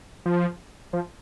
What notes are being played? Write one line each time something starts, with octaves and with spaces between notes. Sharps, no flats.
F3
F3